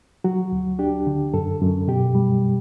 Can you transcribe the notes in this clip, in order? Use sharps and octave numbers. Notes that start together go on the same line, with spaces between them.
F#3 F#4
D2
D4 G4
D3
F#2 A4
F#2
B2 G4
G3